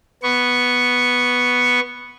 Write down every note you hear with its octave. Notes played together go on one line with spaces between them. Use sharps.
B3 C#6